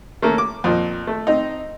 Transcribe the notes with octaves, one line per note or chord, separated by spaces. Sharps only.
A3 A#3 C#4
D6
F2 A#2
A3
C4 D#4